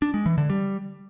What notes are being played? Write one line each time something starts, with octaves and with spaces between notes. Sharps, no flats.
D4
G#3
E3
D3
G3